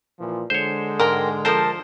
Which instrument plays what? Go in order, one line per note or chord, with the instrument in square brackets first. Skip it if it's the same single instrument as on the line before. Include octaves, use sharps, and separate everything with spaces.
[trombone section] A#2 E3 F3
[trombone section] D3 G#3 [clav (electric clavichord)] C5 C#5
[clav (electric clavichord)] G#2 [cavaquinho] A#4 G5
[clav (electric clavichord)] F3 C5 [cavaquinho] A4 A#4 A5